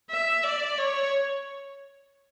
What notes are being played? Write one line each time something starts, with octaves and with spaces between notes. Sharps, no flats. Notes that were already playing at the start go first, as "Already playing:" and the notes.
E5
D5
C#5